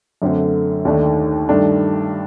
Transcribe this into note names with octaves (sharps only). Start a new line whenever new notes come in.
F#2 D3 A3 C4
D#2 D#3 A3 D4
G2 D#3 A3 D4